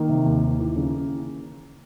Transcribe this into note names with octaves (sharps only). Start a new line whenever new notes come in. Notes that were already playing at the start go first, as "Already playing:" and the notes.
Already playing: D#3 A#3
C3
D#2
D#2
E3
C#3